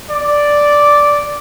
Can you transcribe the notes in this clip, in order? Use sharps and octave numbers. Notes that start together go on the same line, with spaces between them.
D5